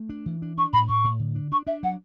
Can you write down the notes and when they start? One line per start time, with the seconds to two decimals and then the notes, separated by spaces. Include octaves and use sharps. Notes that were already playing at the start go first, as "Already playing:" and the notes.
Already playing: A3
0.09 D4
0.26 E3
0.42 D4
0.57 D4 C#6
0.73 A2 B5
0.88 A2 C#6
1.04 A2
1.19 D3
1.35 D4
1.52 D4 C#6
1.67 D4 E5
1.83 F#3 F#5